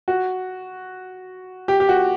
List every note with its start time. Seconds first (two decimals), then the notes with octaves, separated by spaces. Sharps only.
0.08 F#4
1.68 G4
1.80 G4
1.89 F#4